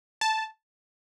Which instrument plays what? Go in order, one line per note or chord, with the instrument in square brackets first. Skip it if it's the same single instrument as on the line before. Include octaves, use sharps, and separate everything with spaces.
[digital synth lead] A5